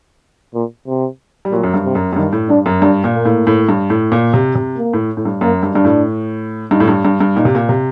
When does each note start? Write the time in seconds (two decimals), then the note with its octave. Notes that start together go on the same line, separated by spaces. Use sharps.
0.54 A#2
0.87 C3
1.45 G3
1.51 A#2 F#3
1.64 F#2
1.74 G2
1.85 C3
1.95 F#2
2.13 F#2
2.16 G2 D#3
2.33 A2
2.49 G2 D4
2.66 F#2
2.81 G2 D4
3.04 A#2
3.14 A#3
3.25 A2
3.47 A2
3.69 G2
3.90 A2
4.12 A#2
4.34 C3
4.55 C3
4.77 A#3
4.93 A2
5.17 A2
5.25 G2
5.41 F#2 A#3
5.63 G2
5.74 G2 D4
5.85 A2
6.71 G2 D#4
6.80 A2
6.88 G2
7.04 G2 D4
7.21 G2
7.36 A#2 D#4
7.45 C3
7.55 A#2
7.69 C3